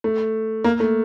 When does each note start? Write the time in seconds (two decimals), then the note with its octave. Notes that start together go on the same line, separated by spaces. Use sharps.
0.04 A3
0.64 A#3
0.80 A3